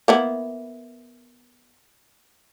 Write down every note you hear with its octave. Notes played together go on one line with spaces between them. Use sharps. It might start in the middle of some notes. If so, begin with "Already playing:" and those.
A#3 B3 E4